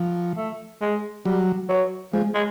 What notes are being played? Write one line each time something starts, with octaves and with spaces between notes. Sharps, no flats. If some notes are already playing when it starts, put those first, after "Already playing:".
Already playing: F3
A3
G#3
F#3 G3
F#3
F3 G#3
G#3